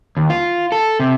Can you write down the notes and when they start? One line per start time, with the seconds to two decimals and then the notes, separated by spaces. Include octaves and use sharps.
0.17 D#2
0.30 F4
0.72 A4
1.00 C3